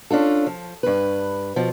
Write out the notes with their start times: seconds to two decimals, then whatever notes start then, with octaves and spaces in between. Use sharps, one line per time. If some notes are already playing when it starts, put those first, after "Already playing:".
0.11 C#4 D4 F4 A4
0.46 F3
0.83 G2 B4
1.56 B2 F3